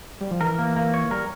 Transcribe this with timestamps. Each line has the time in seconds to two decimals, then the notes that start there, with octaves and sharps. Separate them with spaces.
0.21 G3
0.31 F3
0.41 E3 A#4
0.59 A#3
0.76 A#3
0.94 C#5
1.11 G3 A#4